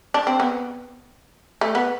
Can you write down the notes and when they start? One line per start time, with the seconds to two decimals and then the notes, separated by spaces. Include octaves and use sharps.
0.14 D4
0.27 C4
0.40 B3
1.61 A3
1.75 B3